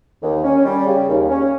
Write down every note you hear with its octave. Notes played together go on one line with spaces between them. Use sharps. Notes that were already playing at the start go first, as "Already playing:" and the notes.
D#2
C#4
G3
C#3
D#2
C#4